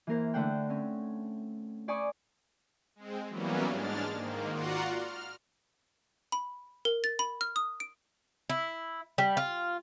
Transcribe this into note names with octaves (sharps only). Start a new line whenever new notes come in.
E3 A#3 A#4 C5
D3 A3 C5 F#5 G5
C4 C#4
C5 D5 G#5 B5 C#6 D#6
G#3 C4
E3 F#3 G3 A#3 B3 C#4
G#2 G#3 D4 F6 A6
G#2 D#3 A#3
F4 F#4 D5 F#5 A#5 C6
F6
B5
A#4
A6
B5
F6
D#6
D7
E4
G3
F4